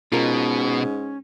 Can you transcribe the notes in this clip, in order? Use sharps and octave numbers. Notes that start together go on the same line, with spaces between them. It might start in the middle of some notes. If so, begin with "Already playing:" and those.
G#2 B2 C#4 F4 A#4